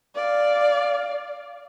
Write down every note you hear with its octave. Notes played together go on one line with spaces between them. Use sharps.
D5 F5